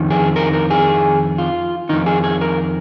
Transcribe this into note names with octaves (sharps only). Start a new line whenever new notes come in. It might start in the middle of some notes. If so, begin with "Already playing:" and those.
Already playing: F2 D#3
G#4
A#4
A#4
G#4
F4
F2 D#3 D#4
G#4
G#4
A#4